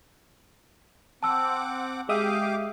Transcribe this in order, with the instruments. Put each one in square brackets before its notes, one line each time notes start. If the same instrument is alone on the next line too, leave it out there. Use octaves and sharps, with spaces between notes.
[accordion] C4 F#5 D6 [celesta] A5 E6
[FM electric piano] G#3 E5 D#6 [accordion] G4 F5 D6